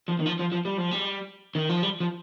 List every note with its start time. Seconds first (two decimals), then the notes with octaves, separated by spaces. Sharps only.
0.08 F3
0.20 D#3
0.26 F3
0.40 F3
0.52 F3
0.65 G3
0.78 F3
0.91 G3
1.55 D#3
1.69 F3
1.83 G3
2.00 F3